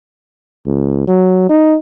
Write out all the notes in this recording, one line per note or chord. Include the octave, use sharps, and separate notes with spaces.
C#2
F#3
D#4